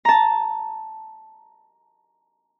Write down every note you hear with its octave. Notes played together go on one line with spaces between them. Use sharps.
A5 A#5